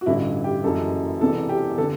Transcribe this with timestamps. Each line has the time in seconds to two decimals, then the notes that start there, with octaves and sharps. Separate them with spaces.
0.01 F#4
0.06 A1 G2 D3 E4
0.44 G4
0.64 F#1 F#2 E3 A4
1.21 E1 E2 C3 E3 A4
1.49 G4
1.78 D3 A4